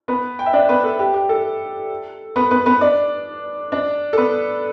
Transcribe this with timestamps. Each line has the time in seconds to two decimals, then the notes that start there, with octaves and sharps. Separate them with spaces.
0.08 B3 B4
0.39 G5
0.46 E5
0.53 D4 D5
0.69 B3 B4
0.84 A4
0.99 G4
1.14 G4
1.29 A4
2.36 B3 B4
2.51 B3 B4
2.66 B3 B4
2.81 D4 D5
3.72 D4 D5
4.13 A4
4.18 B3 B4